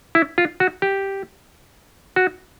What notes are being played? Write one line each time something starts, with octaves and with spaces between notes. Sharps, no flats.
E4
F4
F#4
G4
F#4